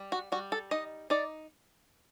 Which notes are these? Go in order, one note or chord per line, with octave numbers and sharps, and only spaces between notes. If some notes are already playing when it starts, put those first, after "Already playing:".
Already playing: G3
F#4
G3 F#4
A4
D#4 D#5
D#4 D5